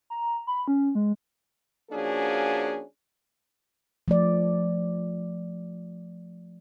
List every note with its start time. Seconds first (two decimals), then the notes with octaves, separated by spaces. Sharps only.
0.10 A#5
0.47 B5
0.68 C#4
0.95 G#3
1.91 F3 A#3 C#4 D4 F#4 G#4
4.08 F3 A3 D5